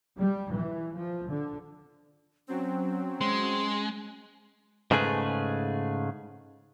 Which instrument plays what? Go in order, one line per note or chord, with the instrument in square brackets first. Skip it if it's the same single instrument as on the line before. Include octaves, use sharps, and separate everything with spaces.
[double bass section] G3
E3
F3
D3
[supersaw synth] F#3 C4 [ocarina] C#4
[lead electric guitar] G#3 [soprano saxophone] C6
[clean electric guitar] G#2 C#3 A3 G#4 B4